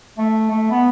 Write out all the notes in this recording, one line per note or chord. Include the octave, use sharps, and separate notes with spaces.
A3
A3
B3